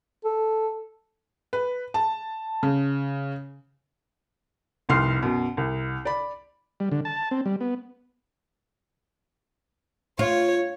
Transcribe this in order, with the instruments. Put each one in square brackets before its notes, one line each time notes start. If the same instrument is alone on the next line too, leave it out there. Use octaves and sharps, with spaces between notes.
[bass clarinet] A4
[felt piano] B4
A5
C#3
F1 C2 C6 F6 C7
F#2 B2
C2
D5 B5
[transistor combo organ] G3
D3
A5
C4
G3
B3
[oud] F4 [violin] C#5